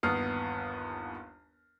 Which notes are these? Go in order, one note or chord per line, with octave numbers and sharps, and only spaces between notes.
G1 D#2 B3 D#6 F6 C7